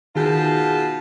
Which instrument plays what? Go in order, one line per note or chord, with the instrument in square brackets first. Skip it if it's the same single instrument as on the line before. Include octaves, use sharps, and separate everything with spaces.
[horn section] B2 F4 A5 [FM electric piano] D#3 G#4 G6